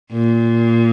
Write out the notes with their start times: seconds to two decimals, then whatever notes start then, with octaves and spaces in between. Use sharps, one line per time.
0.12 A#2